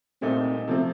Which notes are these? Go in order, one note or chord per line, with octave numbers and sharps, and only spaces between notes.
C2 A#2 A3 C4 D#4
C3 F3 A3 C4